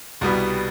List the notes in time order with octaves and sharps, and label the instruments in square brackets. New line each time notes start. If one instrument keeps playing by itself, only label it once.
[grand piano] C2 B2 G3 B3